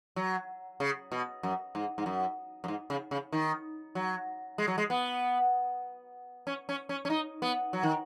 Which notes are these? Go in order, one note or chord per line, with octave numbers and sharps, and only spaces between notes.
F#3
C#3
B2
F#2
G#2
G#2
F#2
F#2
G#2
C#3
C#3
D#3
F#3
G#3
F#3
G#3
B3
C#4
C#4
C#4
C#4
D#4
B3
F#3
D#3